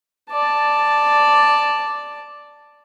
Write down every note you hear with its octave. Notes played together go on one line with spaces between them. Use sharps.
D5 A5